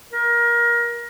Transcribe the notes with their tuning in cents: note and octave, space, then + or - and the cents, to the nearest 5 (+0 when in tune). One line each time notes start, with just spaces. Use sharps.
A#4 +25